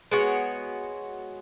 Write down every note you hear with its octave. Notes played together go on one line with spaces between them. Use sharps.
G#3 B3 F#4 C#5